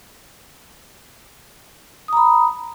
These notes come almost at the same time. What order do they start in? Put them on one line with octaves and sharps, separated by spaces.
D#6 A#5 B5